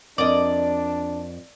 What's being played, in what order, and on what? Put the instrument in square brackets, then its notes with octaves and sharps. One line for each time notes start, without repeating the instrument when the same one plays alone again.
[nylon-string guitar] F2 A#4 D#5 [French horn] D4 [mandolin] D5